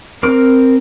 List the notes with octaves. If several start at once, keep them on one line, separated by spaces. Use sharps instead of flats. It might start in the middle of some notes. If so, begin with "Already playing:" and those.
C4 A#4 D6